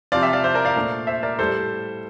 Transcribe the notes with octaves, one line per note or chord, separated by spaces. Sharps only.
C3 F3 C4 D5 F5
E5 G5
D5 F5
C5 E5
A#4 D5
D5 F5
A#2 A3 D4
C5 E5
A#4 D5
A2 G3 A4 C5